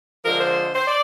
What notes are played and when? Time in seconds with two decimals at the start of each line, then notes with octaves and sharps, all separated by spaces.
0.25 D3 F3 G#3 A#4
0.41 C5
0.75 C5
0.88 D5